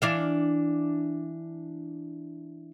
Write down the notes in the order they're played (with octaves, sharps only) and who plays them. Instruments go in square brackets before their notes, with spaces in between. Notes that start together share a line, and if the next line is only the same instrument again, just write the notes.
[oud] E3 D4 F5